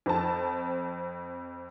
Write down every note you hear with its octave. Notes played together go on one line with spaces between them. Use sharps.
F2 C4 A5